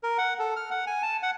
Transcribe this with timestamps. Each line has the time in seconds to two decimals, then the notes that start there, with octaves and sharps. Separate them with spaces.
0.03 A#4
0.18 F#5
0.39 A4
0.56 F6
0.70 F#5
0.87 G#5
1.02 A5
1.23 F#5